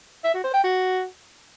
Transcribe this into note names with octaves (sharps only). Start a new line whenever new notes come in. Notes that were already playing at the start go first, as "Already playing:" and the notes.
E5
F#4
C5
G5
F#4